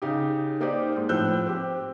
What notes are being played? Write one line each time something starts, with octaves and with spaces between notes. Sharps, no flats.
C#3 D#4 G4
A#3 D#4 G4 C5 D5
G#2
A2 F3 C4 E6 F#6 G6
C4 G4